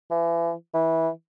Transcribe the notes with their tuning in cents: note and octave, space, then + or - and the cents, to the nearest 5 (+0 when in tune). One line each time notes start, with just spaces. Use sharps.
E3 +35
E3 -15